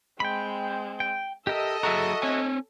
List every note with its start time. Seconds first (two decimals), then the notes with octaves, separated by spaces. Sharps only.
0.20 G#3 C4 G5 B5
1.00 G5
1.47 G4 A4 A#4 D#5 E5
1.83 F#3 F#4 G#4 E5 A#5
2.22 C4 C#5 G#5